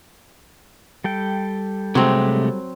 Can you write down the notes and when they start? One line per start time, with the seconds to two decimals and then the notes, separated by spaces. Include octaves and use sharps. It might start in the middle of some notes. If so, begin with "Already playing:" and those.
1.04 G3 A4 G5
1.95 C3 F#3 G#3 A3 C4